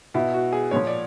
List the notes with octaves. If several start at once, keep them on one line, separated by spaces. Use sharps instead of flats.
B2 E4
F#4
G#4
A#2 F3 C#5
D5